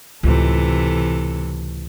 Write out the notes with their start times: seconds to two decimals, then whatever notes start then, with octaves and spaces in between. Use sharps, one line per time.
0.23 C#2 A2 C3 E3 A4